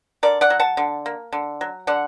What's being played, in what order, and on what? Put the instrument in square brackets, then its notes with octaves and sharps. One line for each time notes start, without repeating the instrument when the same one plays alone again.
[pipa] D3 A#4 D5
D5 F#5
F#3
F#5 A5
D3
A#3
D3
F#3
D3 D5 F#5